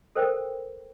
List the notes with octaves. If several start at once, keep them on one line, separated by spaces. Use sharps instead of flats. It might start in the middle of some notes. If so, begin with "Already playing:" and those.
A4 A#4 C5 G5